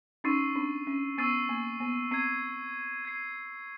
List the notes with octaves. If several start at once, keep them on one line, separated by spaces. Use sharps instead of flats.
C#4 D#4 C#6 E6 A6 C7 D#7
C4 D4
C#4
B3 C#6 E6 A6 C7 D#7
A#3
B3
C4 G#6 C7 D#7
G#6 C7 D#7